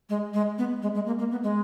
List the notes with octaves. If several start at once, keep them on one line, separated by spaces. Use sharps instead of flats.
G#3
G#3
B3
G#3
G#3
A#3
A#3
B3
G#3